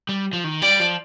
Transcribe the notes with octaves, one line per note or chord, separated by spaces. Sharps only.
G3
F3
D#3
G3 D5
F3